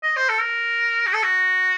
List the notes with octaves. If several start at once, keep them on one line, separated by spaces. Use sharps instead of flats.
D#5
C5
A4
A#4
F#4
A4
F#4